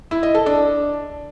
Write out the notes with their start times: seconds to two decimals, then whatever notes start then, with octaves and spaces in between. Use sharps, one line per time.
0.11 E4
0.23 D#5
0.35 A4
0.46 D4